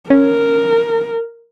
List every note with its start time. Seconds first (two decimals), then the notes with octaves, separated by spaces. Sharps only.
0.10 C#4 A#4